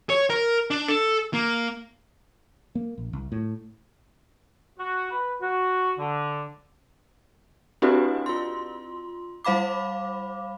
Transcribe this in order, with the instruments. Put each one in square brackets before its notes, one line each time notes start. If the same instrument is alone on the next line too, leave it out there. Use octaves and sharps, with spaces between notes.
[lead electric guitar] C#5
A#4
D4
A4
A#3
[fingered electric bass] A#3
A#1
C2
A2
[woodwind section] F#4
B4
F#4
D3
[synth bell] C4 D4 E4 F#4 G4 B4
F4 C6
G3 C5 F5 B5 D6